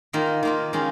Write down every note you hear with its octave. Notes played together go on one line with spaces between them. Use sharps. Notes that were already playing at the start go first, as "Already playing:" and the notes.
D#3 A#3 F4
D#3 A#3 F4
D#3 G#3 C#4 F4